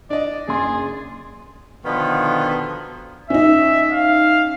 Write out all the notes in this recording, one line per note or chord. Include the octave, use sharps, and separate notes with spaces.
D4 D5 D#5
F#1 G#4 C6 A6
B2 D3 D#3 F3 B3
C#4 D#4 E5
F5